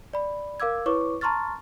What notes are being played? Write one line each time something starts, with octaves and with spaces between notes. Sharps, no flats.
D5 B5
A#4 F5 D6 E6 G#6
E4 B4 C#5 C#6 D6
A5 A#5 C6 C#6 F6 A6